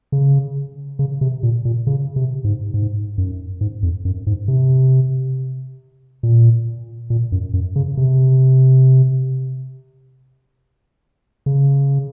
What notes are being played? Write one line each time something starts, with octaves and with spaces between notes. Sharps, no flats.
C#3
C#3
C3
A#2
A#2
C#3
C3
G#2
G#2
F#2
G#2
F2
F#2
G#2
C3
A#2
A#2
F#2
F#2
C#3
C3
C#3